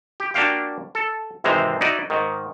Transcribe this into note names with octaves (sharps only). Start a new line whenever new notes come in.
G4
A#3 D4 F#4 G4 F5 G5
A4
G#1 C3 E3 G#3 C5 A#5
D#4 E4 F#4 D5 D#5
G#2 D#3